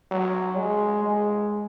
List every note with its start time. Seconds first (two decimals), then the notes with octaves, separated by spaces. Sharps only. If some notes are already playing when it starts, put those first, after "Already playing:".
0.11 F#3
0.58 G#3
1.04 G#3